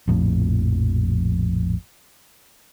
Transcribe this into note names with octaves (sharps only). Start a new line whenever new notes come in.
A#1 F2 A2